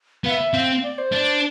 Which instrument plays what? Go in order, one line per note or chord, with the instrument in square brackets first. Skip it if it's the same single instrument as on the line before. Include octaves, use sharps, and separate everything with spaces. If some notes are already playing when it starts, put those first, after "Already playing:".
[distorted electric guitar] B3 [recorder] F5
[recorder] E5
[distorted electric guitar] C4 [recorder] F5
[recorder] D5
C5
[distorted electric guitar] D4